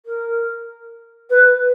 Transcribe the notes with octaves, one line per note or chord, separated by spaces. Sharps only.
A#4
B4